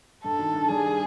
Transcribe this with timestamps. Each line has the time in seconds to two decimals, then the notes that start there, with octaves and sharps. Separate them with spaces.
0.24 G2 A4
0.39 D#3
0.54 G2
0.69 G3 G#4